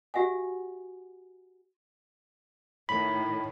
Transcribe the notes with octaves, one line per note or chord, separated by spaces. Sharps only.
F#4 G4 E5 F#5 G#5
A2 D#3 B5